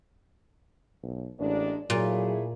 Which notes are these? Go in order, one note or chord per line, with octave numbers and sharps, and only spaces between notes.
B1
A1 G#3 A#3 D4
A#2 F#3 A3 E4 G#4